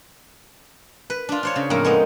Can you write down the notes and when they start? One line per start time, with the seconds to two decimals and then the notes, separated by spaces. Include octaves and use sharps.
1.10 B4
1.29 D4 F4
1.43 D4 C5 C#5
1.56 C#3
1.70 F2 A2 A#3 A#4
1.85 G#3 B3 D#4